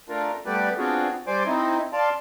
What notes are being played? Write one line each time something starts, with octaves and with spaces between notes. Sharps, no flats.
A3 D4 F4 A#4
G3 A3 B3 G4 B4 D5
B3 C4 D4 F4 F#4 G#4
G3 C5 D5 G#5 C6 D6
C4 D#4 E4
D5 F5 A5 C6